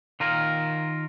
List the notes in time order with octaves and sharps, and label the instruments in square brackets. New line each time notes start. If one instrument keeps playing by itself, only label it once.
[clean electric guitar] D#3 F4 A#4